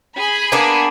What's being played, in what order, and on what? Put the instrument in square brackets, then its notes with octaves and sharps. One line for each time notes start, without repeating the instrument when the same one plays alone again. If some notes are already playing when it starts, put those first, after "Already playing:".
[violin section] G#4 B5
[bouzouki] A#3 B3 D4